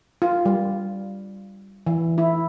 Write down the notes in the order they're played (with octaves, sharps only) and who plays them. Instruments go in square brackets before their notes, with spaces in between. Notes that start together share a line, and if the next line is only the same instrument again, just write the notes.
[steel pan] F4
G3
E3
E4